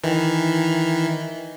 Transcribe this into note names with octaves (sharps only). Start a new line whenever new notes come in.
D#3 E3